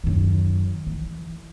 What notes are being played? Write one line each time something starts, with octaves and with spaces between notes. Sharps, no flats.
F#2 D#3
E3